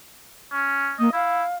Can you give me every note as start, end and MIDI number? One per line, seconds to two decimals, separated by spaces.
0.53 0.93 61
0.99 1.09 58
0.99 1.10 75
1.13 1.43 64
1.13 1.55 77